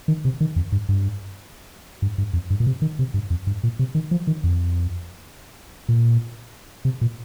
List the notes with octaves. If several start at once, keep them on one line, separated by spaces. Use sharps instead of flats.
D#3
C3
D#3
F2
G2
G2
G2
G2
F2
G2
A#2
C3
D#3
C3
G2
F2
G2
A#2
C3
D#3
F3
D#3
F2
A#2
C3
A#2